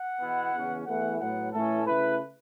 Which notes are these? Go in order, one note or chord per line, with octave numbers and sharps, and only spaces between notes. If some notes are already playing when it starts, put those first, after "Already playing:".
Already playing: F#5
E2 B2 B3 E4
E2 C#3 E3 C#4
E2 E3 A3 E4 F#5
A2 F#3 B3 F#5
A2 E3 A3 C#4 E4 A4
C#3 A3 E4 B4